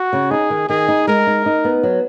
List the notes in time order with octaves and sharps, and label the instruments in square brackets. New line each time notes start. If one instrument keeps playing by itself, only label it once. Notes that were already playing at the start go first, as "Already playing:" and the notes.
Already playing: [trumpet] F#4
[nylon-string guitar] C#3
[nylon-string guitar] D#4 [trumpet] G#4
[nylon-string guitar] D#3
[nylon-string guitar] D#3 [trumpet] G#4
[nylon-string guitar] D#4
[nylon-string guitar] G#3 [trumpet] A#4
[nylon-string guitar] D#4
D#4
B3
F#3